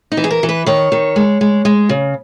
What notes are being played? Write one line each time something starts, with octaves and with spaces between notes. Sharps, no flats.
D#4
E3
G#4
A#4
E3
B4
D#3 C#5
D#3
G#3
G#3
G#3
C#3